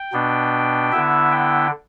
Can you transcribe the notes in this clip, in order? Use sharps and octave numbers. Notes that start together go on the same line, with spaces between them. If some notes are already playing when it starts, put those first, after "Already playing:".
Already playing: G5
B2 B3 D4
D3 B3 E4 E5
G5